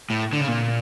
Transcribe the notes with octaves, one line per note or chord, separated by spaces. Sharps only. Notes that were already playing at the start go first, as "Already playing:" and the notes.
A2
D3
C#3
A#2